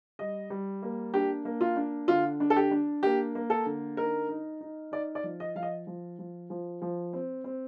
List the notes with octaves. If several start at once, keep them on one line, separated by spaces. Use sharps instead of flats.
G3 D#5
G3
A#3
D4 G4
A#3
F4
D4
D3 F4
D4
A4
G4
D4
A#3 G4
A#3
A4
D3
D#4 A#4
D#4
D#4
D#4 D5
D5
F3
D#5
F3 F5
D#5
F3
F3
F3
F3
C4
C4